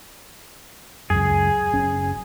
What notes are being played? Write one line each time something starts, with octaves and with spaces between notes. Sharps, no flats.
C#2 F#2 G#4
F#1 C#4